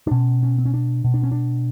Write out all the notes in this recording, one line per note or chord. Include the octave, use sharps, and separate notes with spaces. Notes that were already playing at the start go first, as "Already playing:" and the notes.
D4
B2 C#4
C#4
C4
C#4
D4
B2
D4
C#4
D4